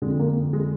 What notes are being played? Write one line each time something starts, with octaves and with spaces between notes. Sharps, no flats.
F2 D3 G#3
A#3
G#3